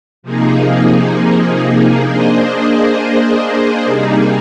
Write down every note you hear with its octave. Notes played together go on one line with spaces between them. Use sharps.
C3 F3 A#3 D#4 G#4
A#3 D4 G#4 C5 D#5
C3 G3 A#3 D#4 G#4